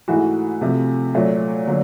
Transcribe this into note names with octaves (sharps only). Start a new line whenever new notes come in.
G#2 E3 A3 F#4
C3 F3 A3
A#2 F#3 A3
D3 F#3 A#3